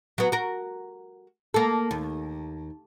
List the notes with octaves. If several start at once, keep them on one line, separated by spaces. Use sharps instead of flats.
F#3 B3
F#4 A#4
A#3 A4
D#2